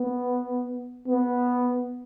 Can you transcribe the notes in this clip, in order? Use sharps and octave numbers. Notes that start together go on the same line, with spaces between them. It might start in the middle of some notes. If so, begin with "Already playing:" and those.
Already playing: B3
B3